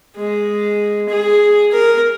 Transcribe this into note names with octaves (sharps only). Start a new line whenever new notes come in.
G#3
G#4
A#4